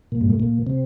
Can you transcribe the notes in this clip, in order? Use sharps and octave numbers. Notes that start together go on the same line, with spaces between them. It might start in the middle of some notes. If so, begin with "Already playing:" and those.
A#2
G2
A2
A#2
C3